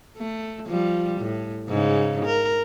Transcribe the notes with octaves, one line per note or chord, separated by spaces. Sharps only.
A3
F3 G3
A2
G#2 C#3
A#4